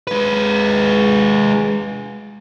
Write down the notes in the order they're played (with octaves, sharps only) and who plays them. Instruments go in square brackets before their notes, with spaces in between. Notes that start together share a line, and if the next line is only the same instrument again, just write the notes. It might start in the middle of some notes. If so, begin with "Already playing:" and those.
[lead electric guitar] G#3 B4